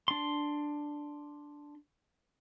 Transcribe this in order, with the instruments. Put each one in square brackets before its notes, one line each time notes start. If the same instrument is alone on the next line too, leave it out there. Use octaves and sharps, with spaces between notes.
[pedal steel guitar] D4 C6